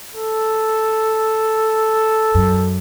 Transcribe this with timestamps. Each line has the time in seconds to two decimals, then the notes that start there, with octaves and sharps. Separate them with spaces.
0.15 A4
2.35 F#2